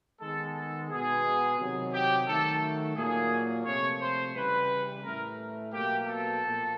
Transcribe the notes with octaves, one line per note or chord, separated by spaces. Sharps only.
D#3 G#3 B3 A4
A4
B2 G#3 B3 G#4
C3 D#3 F#3
G4
D#3 F#3 A3 A4
A#2 F#3 A#3 G#4
C3 F3 A3 C#5
C5
C#3 E3 G3 B4
A2 E3 A3 A#4
B2 F#3 A#3 G4
A4
A#2 F3 A#3